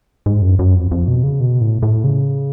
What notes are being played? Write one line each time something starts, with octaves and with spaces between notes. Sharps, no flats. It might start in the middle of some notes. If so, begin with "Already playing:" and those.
G#2
F#2
F#2
F2
F2
B2
C#3
B2
A2
A2
C#3